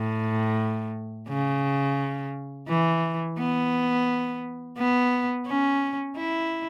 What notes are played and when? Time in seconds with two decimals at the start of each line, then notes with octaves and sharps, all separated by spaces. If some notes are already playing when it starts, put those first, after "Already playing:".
Already playing: A2
1.28 C#3
2.68 E3
3.38 B3
4.78 B3
5.47 C#4
6.17 E4